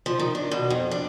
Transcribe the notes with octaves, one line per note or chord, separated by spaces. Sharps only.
F3
D#3
D4
B2
F2
D4